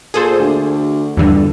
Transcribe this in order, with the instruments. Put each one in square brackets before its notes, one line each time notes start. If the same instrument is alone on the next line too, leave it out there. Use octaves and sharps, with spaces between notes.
[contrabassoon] A#2 [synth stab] G#4 A4 C5
[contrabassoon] D2
[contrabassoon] G1 [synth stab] E2 G2 D3